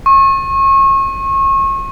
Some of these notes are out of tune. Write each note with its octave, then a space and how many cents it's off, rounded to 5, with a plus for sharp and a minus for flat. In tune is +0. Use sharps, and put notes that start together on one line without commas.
C#6 -35